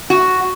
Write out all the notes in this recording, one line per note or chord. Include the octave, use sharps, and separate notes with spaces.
F#4